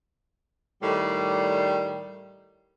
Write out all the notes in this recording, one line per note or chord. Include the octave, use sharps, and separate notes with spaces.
A2 D#3 G3